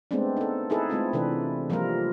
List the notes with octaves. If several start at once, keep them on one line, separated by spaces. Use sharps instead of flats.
G#3 A3 B3 C4 D4
D#4 A4
D#4 E4 G#4 A4 B4
G#3 A3 C4 F4
C3 E3 D4 A4 B4
F3 G3 A#3 F4 A#4